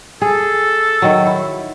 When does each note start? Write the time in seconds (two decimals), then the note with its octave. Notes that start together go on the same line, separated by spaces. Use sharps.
0.22 G#4 A4
1.02 D#3 F#3
1.27 E4